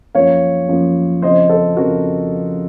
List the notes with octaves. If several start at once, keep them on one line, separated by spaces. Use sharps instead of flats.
F#2 F3 A#3 C#5 F5
F#2 F3 A#3
F2 C#3 F3 C5 D#5
A4 C5
F2 C#3 F3 F#4 A#4